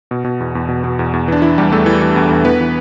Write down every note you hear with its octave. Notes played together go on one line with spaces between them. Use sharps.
B2
B2
E2
E2
B2
B2
E2
E2
E3 D4
E3 E4
E2 G3 G4
E2 A3 A4
E3
E3
E2
E2
E3 B3 B4
E3